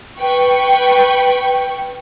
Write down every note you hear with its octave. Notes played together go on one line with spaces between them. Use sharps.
B4 G5 C#6